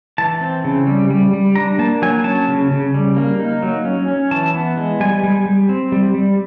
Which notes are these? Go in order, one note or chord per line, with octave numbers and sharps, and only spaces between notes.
E3 A5
C4
C#3
G3
G3
G3
D4 A#5
A#3 A5
F#3 G#5
C#4 A5
C#3
C#3
G3
A#3
D#4
F#3
C#4
C#4
E3 A5
B3
G#3
G3 G#5
G3
G3
C4
G3
G3